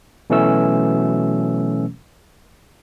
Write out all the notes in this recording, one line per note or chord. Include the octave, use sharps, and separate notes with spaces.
B2 E3 F#3 A3 C#4 E6